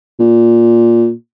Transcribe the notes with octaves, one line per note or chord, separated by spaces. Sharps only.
A#2